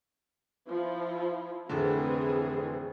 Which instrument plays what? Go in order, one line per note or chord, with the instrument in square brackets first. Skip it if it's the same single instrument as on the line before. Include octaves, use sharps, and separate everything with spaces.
[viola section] F3 E4 F4
[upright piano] F1 A2 D3 [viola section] E3 C4 G#4